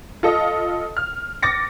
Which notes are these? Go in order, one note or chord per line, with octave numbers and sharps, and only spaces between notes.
F4 A4 D#5
F6
D6 A6 A#6 C#7